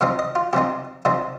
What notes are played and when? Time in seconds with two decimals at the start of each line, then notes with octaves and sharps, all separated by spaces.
0.01 C3 F3 C4 D#4 F5
0.19 D#5
0.35 F4
0.53 C3 F3 C4 D#4 G4
1.05 C3 F3 C4 D#4